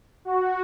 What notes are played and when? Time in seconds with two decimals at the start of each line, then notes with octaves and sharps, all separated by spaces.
0.25 F#4